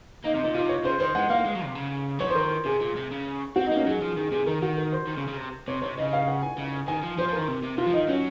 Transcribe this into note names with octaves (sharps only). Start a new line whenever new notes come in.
A#3 D#4
C3
D#4
A#2
C3 F4
C#5
C#3 C5
D#3 C5
G#3 F#5
A#3 F5
G#3
F#3
C3
C#3
F#3 C#5
F3 C5
D#3 A#4
C3 G#4
A#2
C3
C#3
C4 F#4
A#3 D#4
C#4
F#3 G#4
F3 G#4
D#3 G#4
C3 G#4
D#3 A#4
D#3 F#4
A#4
C5
D#3
C#3
C#3
C3
C3 C#5
C3 C#5
C#3 D#5
F5
F#5
G#5
C#3
D#3 G#5
F3
F3 C5
F3 A#4
D#3
C3
C3
C3 F4
F3
D#3 D#4
F#3 C#4